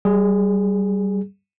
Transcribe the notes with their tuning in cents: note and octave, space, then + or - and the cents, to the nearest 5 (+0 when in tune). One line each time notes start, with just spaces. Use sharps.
G3 -20 G#4 +0